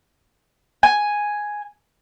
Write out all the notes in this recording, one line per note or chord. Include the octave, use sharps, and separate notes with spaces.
G#5